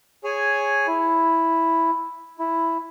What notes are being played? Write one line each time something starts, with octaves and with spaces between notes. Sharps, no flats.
G#4 C#5 G#5
E4
E4